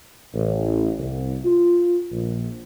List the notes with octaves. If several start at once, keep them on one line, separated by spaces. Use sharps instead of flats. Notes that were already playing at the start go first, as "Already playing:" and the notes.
A1
C2
F4
A#1